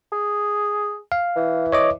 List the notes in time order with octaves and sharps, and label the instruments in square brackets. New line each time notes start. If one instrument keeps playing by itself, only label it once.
[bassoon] G#4
[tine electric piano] F5
[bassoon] E3
[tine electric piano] C#5 D#5 D6